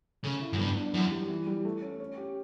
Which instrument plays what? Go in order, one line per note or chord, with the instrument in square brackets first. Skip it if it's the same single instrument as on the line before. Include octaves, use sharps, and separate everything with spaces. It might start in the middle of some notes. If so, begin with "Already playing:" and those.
[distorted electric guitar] C#3 [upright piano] A3
[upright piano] E4
[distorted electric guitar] F#2
[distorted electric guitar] G2 [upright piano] B3
[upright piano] D4
[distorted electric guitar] F#2 [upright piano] E3
[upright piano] G3
E3
G3
A3
C#4
C#4
G4